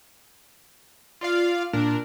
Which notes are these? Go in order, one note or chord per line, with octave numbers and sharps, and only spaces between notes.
F4 D5 F5
A#2 D4 A#4